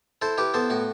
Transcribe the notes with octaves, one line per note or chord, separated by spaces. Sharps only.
E4 A4 C5
E4 G4 B4
B3 A4 C5
A2 F#4